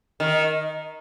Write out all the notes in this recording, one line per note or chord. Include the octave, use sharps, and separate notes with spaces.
D#3